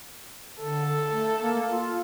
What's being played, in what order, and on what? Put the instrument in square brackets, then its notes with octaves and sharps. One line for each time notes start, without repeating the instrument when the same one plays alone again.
[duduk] D3 [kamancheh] A4
[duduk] A3
A#3
F4